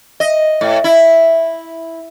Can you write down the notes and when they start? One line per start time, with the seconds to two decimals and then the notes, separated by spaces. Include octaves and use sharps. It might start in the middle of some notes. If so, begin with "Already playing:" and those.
0.20 D#5
0.61 A2
0.84 E4